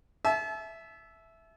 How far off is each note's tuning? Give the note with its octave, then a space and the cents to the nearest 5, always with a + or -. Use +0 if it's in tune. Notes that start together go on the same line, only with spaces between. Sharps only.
E5 +0 A5 -40